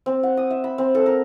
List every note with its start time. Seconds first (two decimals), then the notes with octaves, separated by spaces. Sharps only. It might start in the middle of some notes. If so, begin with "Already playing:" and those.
0.06 C4
0.23 F#5
0.37 D#6
0.50 E5
0.64 B5
0.78 C4
0.95 A4
1.06 A#4